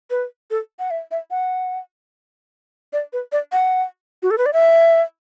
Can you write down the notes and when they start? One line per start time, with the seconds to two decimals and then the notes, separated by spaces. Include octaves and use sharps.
0.10 B4
0.51 A4
0.79 F#5
0.91 E5
1.11 E5
1.31 F#5
2.93 D5
3.13 B4
3.32 D5
3.52 F#5
4.23 F#4
4.31 A4
4.38 B4
4.46 D5
4.53 E5